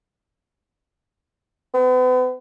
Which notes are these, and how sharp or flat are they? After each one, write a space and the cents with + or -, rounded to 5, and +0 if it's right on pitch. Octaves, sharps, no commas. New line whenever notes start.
B3 +40